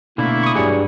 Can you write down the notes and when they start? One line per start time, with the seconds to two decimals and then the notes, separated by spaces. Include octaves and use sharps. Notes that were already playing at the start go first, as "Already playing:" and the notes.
0.18 B2 D3 A3 A#3 D4 E4
0.43 C#6 D#6
0.55 G2 F#3 G3 G#4 C#5